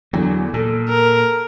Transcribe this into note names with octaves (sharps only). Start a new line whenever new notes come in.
E2 D3 F#3
A#2 A4
A#4